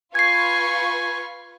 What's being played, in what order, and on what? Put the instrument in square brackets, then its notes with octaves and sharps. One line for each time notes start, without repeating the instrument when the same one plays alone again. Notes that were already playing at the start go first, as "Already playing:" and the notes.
[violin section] F4 B4 C#6 [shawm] G#5 [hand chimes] G#6 C7